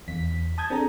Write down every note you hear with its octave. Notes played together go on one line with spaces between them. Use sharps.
E2 B6
A5 D#6 G6 G#6
C4 D4 G#4 A4 A#5